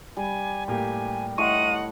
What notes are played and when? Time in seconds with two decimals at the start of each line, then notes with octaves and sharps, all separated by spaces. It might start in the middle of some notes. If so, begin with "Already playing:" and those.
0.17 G3 G#5
0.68 A2 A#3 G4 G#5
1.38 A2 A3 D#5 F#5 C6 C#6 D#7